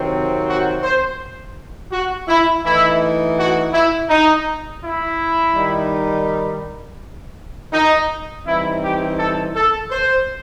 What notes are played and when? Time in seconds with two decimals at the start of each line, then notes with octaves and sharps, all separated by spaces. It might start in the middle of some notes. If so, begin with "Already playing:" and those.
Already playing: C3 D#3 F#3 C4
0.47 F#4
0.83 C5
1.92 F#4
2.28 E4
2.64 E3 A3 D#4 E4
3.37 F#4
3.73 E4
4.09 D#4
4.82 E4
5.55 D#3 G3 D#4
7.73 D#4
8.45 E3 G3 C4 D#4 E4
8.82 G4
9.17 A4
9.54 A4
9.91 C5